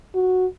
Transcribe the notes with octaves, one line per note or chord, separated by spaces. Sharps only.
F#4